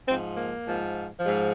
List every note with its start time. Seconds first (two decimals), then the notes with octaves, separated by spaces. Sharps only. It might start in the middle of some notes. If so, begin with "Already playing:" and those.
0.08 G#2 F3 C4
0.36 A#3
0.64 G#2 F3
1.20 G#2 F3